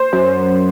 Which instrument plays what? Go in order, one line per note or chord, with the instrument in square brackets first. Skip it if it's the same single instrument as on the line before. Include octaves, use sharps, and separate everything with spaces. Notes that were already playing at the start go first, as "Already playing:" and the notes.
Already playing: [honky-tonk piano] C5
[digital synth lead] F#2